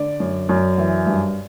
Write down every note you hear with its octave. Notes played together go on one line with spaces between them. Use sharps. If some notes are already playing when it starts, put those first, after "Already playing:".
Already playing: D3 D5
F#2
F#2
E3
G2